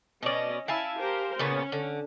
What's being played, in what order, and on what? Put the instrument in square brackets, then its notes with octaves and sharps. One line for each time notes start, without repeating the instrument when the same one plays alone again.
[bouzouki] B2 D5 [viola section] C#4 D#5
[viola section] E4 [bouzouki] F5 G#5 A5
[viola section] G4 A#4 C5
[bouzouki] A#2 C#3 B3 [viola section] C#4
[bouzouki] D3